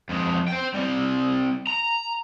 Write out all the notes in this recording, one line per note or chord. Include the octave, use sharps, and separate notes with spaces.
F2 G#3
C5 G5
G3 C4
A#5